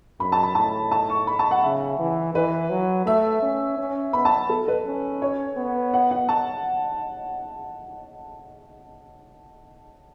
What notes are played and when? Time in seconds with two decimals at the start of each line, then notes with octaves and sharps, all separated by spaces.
0.20 F#2 B5
0.32 A5
0.43 B5
0.55 A2 A5
0.91 A5
1.10 C#6
1.27 B5
1.39 A5
1.51 F#5
1.63 C#3 E5
1.99 E3
2.35 E3 B4
2.70 F#3
3.06 A3 E5
3.42 C#4
3.78 C#4
4.13 B3 B5
4.25 A5
4.49 A4
4.68 B4
4.86 C#4
5.22 C#5
5.57 B3
5.94 F#5
6.11 F#5
6.29 A5